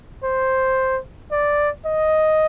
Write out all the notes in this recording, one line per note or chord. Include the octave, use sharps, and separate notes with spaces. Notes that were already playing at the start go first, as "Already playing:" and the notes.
C5
D5
D#5